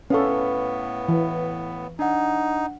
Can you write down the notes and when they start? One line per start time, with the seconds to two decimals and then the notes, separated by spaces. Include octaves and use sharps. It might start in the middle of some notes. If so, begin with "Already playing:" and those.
0.10 A2 B3 C#4 A4 B4 F5 C#6
1.09 E3
1.99 D4 D#4 F#5